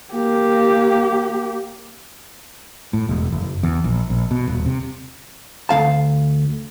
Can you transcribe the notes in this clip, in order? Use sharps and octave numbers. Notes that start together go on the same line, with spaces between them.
A#3 G4
A2
E1
F#1
E2
A#1
A#1
B2
D#1
C3
D2 F3 F5 A5